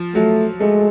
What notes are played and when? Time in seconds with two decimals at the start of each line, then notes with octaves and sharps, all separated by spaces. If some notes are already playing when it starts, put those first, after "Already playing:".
Already playing: F3
0.15 F#3 A3
0.60 G#3 A3